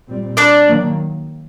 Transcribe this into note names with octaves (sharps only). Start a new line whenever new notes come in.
A#2 G3 C4
D4 D5
D#3 F#3 A#3